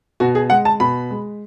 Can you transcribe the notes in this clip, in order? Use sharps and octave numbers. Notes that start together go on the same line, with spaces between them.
B2 F#4
G#4
G#3 F#5
A5
B2 B5
G#3